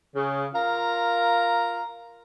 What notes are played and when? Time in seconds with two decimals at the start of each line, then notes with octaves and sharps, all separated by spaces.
0.15 C#3
0.54 F4 A#4 F5 A#5